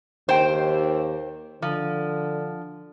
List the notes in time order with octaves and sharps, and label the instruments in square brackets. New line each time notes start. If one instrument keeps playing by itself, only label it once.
[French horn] D#2 [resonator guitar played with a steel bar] C5 G5
[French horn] D3 [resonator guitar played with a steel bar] F3